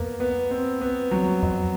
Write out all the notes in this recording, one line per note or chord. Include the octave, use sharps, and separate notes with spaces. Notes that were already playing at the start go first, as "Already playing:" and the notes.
Already playing: F2 A#3 B3
B3
C4
B3
F#3
F2